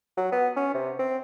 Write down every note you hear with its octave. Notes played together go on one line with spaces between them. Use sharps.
F#3
B3
C#4
C3
C4